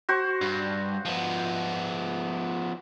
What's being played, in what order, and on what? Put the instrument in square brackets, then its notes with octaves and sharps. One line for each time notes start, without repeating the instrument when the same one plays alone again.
[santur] F#4 C5 C#6
[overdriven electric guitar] G2
F3 B3